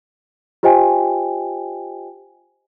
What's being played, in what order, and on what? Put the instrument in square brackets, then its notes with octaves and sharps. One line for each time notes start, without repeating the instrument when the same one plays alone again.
[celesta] F4 G4 C5 D#5 G5 G#5